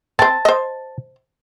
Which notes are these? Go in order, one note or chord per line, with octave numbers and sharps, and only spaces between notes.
C4 C5 A5
C5 D#5